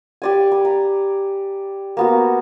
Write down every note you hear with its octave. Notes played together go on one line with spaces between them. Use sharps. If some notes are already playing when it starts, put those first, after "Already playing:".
G4 D5 G#5
B5
A#5
A#3 B3 F#4